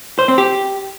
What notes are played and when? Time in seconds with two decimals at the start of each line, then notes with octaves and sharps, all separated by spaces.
0.19 C5
0.28 C4
0.38 G4